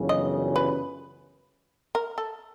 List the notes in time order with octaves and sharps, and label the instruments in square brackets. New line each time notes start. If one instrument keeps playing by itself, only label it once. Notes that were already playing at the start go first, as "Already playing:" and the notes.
Already playing: [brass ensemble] G1 F#2 C#3 E3
[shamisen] D#5
B4
A#4
A4